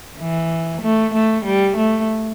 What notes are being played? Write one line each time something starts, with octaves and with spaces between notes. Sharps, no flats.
E3
A3
A3
G3
A3